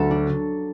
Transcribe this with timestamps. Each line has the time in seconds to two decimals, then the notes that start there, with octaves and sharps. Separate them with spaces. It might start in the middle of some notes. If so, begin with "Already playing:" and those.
Already playing: D2 D3 F#3 A4
0.11 D4